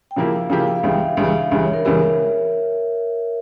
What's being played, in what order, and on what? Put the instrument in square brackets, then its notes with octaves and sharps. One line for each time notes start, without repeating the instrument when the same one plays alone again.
[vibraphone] G5
[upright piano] C#3 F3 A#3 E4 G4 [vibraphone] F5
[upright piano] C#3 F3 A#3 E4 G4 [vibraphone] G5
[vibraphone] F5
G5
F5
[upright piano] C#2 C#3 E3 G3 [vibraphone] E5
[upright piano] C#2 C#3 E3 G3
[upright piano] C#2 C#3 E3 G3 [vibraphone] E5
[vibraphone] C#5
A#4
[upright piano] C#2 C#3 E3 G3 [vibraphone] A#4